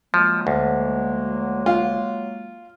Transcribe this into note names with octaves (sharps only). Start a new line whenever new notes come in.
F3 F#3 G#3 A#3
D2
F4